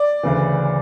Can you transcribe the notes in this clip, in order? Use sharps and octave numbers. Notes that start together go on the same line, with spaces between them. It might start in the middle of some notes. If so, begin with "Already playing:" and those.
Already playing: D5
D2 C#3 E3